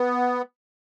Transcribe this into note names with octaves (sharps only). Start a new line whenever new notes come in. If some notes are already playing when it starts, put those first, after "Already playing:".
Already playing: B3